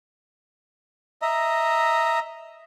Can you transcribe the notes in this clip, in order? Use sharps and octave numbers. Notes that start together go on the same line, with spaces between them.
D#5 E5 A#5